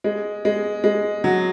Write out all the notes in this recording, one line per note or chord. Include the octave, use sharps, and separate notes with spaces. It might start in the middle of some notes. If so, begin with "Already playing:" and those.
G#3
G#3
G#3
F#3